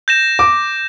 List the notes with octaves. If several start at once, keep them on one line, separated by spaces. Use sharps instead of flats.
G6 A#6 E7
D6